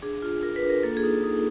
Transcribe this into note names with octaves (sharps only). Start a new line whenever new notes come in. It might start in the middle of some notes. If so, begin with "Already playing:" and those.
D4 G#4
F4
F4 A#4
B4
D4
A#4
A#3 A4
G#4
D#4
D#4